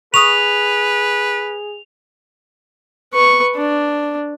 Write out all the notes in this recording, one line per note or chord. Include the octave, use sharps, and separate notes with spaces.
G#4 B4 C#6 D#6 F7
B4 C#6
D4